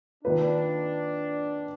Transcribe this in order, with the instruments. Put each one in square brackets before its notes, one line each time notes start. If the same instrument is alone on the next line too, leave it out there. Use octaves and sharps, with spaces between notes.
[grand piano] D#3 A#3 F4 B4 [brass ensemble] D4